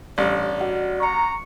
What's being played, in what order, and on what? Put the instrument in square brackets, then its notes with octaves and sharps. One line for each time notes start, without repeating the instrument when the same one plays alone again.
[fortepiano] A1 G2 [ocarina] D5
[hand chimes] F#4 D#5 F#5
[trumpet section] A#5 [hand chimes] C#6 C#7